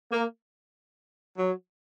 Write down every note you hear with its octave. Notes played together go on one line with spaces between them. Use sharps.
A#3
F#3